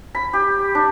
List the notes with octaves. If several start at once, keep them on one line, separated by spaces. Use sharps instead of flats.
B5
G4
D4